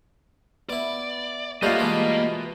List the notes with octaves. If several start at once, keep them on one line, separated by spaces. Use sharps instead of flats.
B3 E4 D5
G3 A3 A#3 D4 F4 B4 C#5 D#5
E3 G#3 A3